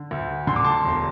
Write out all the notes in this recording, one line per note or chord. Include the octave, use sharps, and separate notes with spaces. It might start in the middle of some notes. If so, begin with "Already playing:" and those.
Already playing: D3
D2
D3 C6
D6
A5 C6
E1